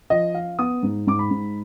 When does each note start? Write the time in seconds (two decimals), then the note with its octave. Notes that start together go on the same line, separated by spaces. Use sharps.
0.10 F3 D#5
0.34 F3 F5
0.59 B3 D#6
0.83 G#2
1.07 G#2 D6
1.19 B5
1.31 G#2